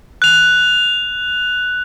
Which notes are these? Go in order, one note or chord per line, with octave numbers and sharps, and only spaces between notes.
F#6 F7